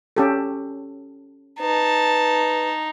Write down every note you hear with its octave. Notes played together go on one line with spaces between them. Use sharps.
C#4 G4 A4
D#4 B4 A5